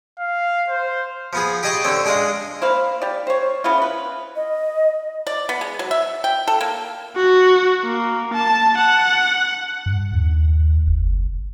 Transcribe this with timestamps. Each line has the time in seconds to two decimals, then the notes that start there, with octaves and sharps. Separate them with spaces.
0.20 F5
0.70 C5
1.33 F3 B3 G#4
1.63 G4 G#4 D#5 G#5 A5 C#6
1.84 D3 C4 C#5
2.05 G#3 D4 G#4 D#5 F5
2.61 A#3 C5 F5 B5
3.02 G4 D5
3.27 C5 C#5
3.64 C#3 B3 E4 F4
3.82 B4
4.36 D#5
5.27 D5
5.49 B3
5.61 G#3
5.79 F#3
5.91 E5
6.24 G5
6.48 A4
6.61 A#3
7.16 F#4
7.84 A#3
8.34 A5
8.78 F#5
9.86 G2
10.13 D#2
10.87 F#1